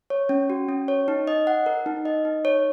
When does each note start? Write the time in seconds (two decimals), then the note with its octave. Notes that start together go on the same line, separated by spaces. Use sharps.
0.10 C#5
0.29 C#4
0.50 F#4
0.69 C#4
0.88 C#5
1.08 D#4
1.27 D#5
1.47 F#5
1.66 A#4
1.86 D#4
2.05 D#5
2.25 D#4
2.45 C#5